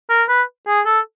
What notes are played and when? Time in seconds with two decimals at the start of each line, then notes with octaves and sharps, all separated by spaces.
0.10 A#4
0.29 B4
0.67 G#4
0.86 A4